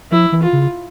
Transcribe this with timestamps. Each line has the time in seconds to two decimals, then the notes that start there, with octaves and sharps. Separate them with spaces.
0.12 F3 E4
0.32 E3
0.43 F4
0.53 C#3